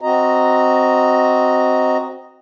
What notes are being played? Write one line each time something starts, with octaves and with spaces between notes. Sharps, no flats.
C4 F#4 D#5 A#5